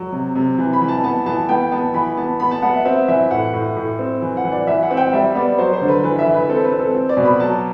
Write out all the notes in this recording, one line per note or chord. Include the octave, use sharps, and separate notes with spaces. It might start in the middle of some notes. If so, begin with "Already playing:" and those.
Already playing: F#3
C3
C3
E3
B5
E3
A5
B3 A5
E3 A5
B3 G5
B3 A5
E3 B5
B3 A5
B3 B5
A5
B3 F#5
E5
C4 E5
E3 E5
A2 F#5
A2
A2
C4
E3
F#5
E3
D5
E3 E5
F#5
C4
G5
G3 E5
B3 D5
F#3 C5
C5
D3
B4
E3 B4
E5
E3
B4
C4 A4
B4
C4
A4
C4
D5
B2
B5
F#3 A5